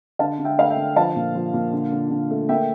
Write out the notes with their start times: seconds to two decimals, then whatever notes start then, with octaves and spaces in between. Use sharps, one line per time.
0.19 D3 F5 A5
0.39 D3
0.45 E5 G5
0.58 A3 F5
0.70 E5 G5
0.76 D3
0.96 F3 F5 A5
1.16 A#2
1.35 F3
1.53 A#2
1.73 D3
1.92 D3
2.10 D3
2.30 A3
2.49 A#3 E5 G5